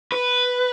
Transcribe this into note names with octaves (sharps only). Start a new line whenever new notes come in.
B4